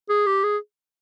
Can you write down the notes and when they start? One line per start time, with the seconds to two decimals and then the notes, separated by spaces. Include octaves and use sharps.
0.09 G#4
0.26 G4
0.44 G#4